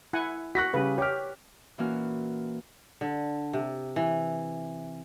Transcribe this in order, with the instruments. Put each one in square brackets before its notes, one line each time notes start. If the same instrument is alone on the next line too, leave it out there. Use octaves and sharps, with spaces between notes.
[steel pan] E4 F#5 G#5
[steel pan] F#4 [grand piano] F#6 A#6 B6
[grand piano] C#3 G3 [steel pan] B4
[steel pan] G4 [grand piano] C#5 F6
[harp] A#2 E3 A#3 C#4 F#4 F6
[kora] D3
C3
E3